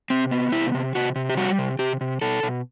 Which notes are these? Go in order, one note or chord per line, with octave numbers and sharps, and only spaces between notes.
C3 C4
B3
C3 E4
C3
C3 F#4
C3
G4
G3 F#4
C3
C3 G4
C3
B2 A4
B2